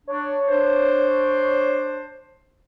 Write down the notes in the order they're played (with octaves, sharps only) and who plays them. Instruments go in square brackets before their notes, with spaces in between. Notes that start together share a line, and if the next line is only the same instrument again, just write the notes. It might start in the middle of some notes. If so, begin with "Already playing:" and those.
[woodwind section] D4 [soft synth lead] C#5
[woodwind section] D4 C5